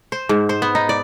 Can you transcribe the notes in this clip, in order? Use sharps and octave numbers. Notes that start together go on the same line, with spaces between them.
C5
G#2
C5
B3
D#4
D5